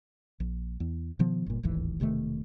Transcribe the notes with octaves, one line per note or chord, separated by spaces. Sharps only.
A#1
E2
B2 D#3 F3 B3
G1 A#2
D1 G#1 D#2 E3
E1 C3 D#3 A3